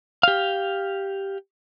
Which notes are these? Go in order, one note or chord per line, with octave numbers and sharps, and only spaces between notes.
G4 F5